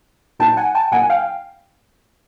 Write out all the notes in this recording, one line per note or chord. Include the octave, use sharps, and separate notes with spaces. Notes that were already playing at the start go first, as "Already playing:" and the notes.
A#2 F#3 A#3 D#4 G5 A5
F#5 G#5
G5 A5
A#2 F#3 A#3 D#4 F#5 G#5
F5 G5